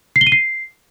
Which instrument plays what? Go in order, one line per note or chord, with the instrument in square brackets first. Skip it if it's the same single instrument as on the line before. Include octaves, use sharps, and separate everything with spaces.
[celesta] C7
G7
D#7
C7